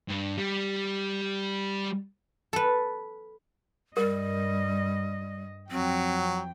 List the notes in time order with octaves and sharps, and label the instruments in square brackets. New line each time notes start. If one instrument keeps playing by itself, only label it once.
[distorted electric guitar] G2
G3
[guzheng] A4 B4
[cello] G2 D#5 [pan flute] G3 [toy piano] A#4
[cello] F2 G5 [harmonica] F#3 [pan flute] C4